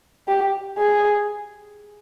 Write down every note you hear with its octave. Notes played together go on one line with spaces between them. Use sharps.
G4
G#4